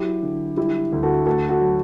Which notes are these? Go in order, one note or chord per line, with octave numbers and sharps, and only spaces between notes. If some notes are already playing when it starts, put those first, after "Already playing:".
Already playing: F#3 E4 G4
D3
G3 E4 G4
D2
F#4 A4
A3 F#4 A4
F#4 A4
F#3